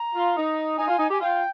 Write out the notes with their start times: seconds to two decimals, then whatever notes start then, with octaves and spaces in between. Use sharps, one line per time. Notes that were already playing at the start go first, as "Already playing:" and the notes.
Already playing: A#5
0.14 F4
0.35 D#4
0.77 D#4 G#5
0.87 F4
0.98 D#4
1.08 G4 G#5
1.19 F4 G#5
1.24 G5